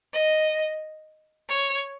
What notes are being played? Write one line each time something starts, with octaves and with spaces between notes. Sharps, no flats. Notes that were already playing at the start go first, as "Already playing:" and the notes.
D#5
C#5